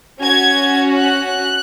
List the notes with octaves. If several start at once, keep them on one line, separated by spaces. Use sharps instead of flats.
C#4 F#4 G#6
F#6